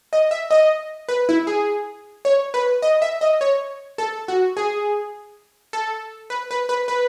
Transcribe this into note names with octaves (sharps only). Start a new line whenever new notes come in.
D#5
E5
D#5
B4
E4
G#4
C#5
B4
D#5
E5
D#5
C#5
A4
F#4
G#4
A4
B4
B4
B4
B4